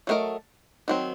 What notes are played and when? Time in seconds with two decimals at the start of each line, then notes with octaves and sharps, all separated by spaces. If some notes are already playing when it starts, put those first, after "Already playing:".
0.07 F#3 A3 D#4 A#4 D#5
0.88 D#3 F#3 C4